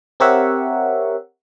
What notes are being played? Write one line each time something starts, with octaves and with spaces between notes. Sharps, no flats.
C4 G4 A#4 C#5 E5 F#5